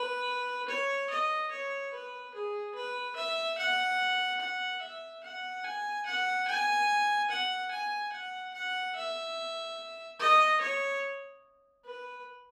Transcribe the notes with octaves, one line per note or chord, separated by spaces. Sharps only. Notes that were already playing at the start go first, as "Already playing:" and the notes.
Already playing: B4
C#5
D#5
C#5
B4
G#4
B4
E5
F#5
F#5
E5
F#5
G#5
F#5
G#5
F#5
G#5
F#5
F#5
E5
D#5
C#5
B4